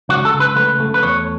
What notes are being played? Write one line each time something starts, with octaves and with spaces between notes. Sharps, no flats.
C#2 F#4
A4
C#2
B4
A3 B4
A3
B4
E2 C#5